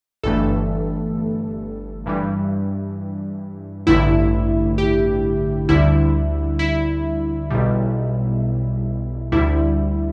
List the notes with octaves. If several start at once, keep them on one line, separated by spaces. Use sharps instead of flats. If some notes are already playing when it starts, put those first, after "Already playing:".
G1 G2 E3 A3 A4
G2 E3 G3
A1 G2 D3 A3 E4
G4
D2 D3 G3 E4
E4
B1 B2 G3
D2 D3 G3 E4